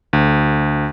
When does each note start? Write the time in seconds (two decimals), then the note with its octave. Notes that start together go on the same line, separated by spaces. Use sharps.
0.13 D2